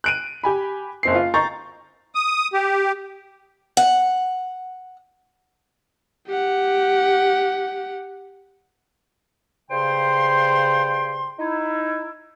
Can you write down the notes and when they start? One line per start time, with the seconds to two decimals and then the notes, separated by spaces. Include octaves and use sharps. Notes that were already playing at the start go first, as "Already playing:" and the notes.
0.04 F#6 D7 D#7
0.43 G4 G#5 B5
1.03 F#1 C4 C7
1.15 F4
1.34 A#5 C#6 G6 A6
2.15 D#6
2.53 G4
3.77 F#5
6.27 G4 F#5
9.70 G2 C#3 C5 G5 C6
11.39 D#4 E4